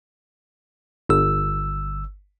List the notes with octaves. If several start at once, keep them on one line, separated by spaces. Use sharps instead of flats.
G1 E6